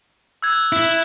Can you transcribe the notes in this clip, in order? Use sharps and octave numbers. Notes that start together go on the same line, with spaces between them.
E6 F#6 G#6
E4